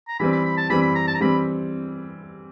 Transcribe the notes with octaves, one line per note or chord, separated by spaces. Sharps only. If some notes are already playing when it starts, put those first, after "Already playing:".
A#5
E3 G3 C4 B5
B5
B5
A5
E3 G3 C4 B5
B5
A#5
A5
A#5
E3 G3 C4 B5